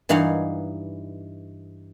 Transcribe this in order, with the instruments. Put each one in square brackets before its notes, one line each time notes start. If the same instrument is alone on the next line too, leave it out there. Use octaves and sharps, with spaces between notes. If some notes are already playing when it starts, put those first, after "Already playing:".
[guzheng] G2 E3 D#4 F5 F#5 G#5